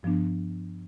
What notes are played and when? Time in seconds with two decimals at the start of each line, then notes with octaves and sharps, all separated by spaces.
0.03 G2 F3 B3 D4